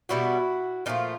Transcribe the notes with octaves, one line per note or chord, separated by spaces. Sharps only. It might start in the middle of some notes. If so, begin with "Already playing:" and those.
B2 G3 B3 E4 F#4
A#2 F3 A3 D#4 F4